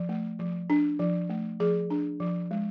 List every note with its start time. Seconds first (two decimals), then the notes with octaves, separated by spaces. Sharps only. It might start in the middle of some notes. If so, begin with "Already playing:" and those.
Already playing: F3
0.09 A3
0.39 F3
0.70 D4
0.99 F3
1.30 A3
1.60 F3 G#4
1.90 D4
2.20 F3
2.51 G#3